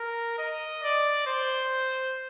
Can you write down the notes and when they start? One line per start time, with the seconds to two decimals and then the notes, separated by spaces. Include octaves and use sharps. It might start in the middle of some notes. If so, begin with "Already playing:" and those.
Already playing: A#4
0.38 D#5
0.83 D5
1.27 C5